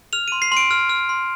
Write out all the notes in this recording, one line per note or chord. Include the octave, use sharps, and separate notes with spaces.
F6 F7
C6 D#7
C7
C6
D7
F6
F6
C6